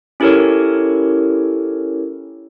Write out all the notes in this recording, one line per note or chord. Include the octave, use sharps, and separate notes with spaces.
C#4 E4 G4 A4 A#4 C#5